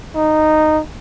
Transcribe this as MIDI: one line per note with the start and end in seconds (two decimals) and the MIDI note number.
0.16 0.81 63